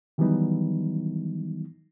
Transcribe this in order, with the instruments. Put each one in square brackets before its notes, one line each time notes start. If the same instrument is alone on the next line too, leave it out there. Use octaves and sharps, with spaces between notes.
[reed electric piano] D#3 E3 F#3 G3 B3 D#4